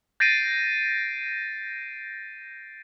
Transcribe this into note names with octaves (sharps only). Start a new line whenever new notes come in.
G6 A6 A#6 C7 D7 D#7